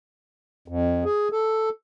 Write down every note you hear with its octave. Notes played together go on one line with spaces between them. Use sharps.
F2
G#4
A4